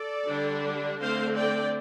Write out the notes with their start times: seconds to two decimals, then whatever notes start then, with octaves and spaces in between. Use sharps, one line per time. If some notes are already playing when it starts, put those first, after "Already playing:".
Already playing: A4 D5
0.27 D3 G3 D4
1.01 D3 A3 C4 C5 F5
1.36 D5 G5